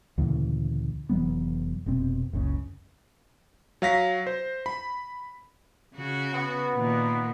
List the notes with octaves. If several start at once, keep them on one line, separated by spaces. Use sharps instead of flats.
D2 A#2 C#3 E3
F1 E3 F#3 B3
F1 B2 C4
F#1 C#2 C#3
F#3 F5 A#6 B6
C5
B5
C#3 F#4
B3
A#2 D#3